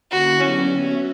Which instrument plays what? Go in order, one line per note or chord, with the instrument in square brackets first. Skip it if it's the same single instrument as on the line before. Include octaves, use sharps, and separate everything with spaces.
[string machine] D3 A#3 C#4 E4 [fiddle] F#4
[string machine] D3 F#3 B3 D4 G4 [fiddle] C#4
[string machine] B3 F#4 C#5 E5